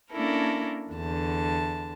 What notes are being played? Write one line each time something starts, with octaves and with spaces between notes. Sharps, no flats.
A#3 C#4 D4 E4 A4 A#4
E2 D3 A5